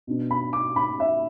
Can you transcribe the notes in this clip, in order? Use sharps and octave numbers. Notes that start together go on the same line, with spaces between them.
B2 B3 D4
B5
D6
B5
E5